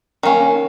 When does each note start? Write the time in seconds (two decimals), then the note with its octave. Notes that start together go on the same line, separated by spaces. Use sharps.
0.23 D#3 A#3 C#4